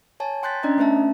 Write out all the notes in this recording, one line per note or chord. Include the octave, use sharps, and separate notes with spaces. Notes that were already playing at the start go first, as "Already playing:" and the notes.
C#5 G#5 A5
G5 C6 F#6 G6 A6 B6
C#4 D4 D5 D#5 A#5
A3 B3 C#4 C5 E5 A5